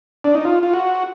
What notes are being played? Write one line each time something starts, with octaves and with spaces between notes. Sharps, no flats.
D4
D#4
F4
F4
F#4